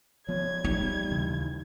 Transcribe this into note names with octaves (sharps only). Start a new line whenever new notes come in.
F3 B3 C#5 G#6
G3 D#4
D#2 C#3 E3